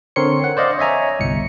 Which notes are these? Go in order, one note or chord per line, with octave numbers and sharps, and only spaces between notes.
D3 C4 A#4 C#5 C6 C#7
F#5
C5 D5 D#5 F5
C#5 D#5 E5 G#5 A#5
G1 C2 C#7